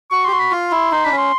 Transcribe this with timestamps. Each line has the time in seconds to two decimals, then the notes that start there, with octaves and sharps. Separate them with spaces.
0.11 F#4 C#6
0.25 G4 C6
0.32 F#4
0.39 B5
0.52 F4 C6
0.72 E4
0.91 D#4 C6
1.04 D4 B5
1.11 C#4
1.17 C6